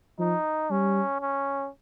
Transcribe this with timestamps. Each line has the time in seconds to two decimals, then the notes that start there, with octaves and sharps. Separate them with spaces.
0.19 F3 D#4
0.70 G3 C#4
1.21 C#4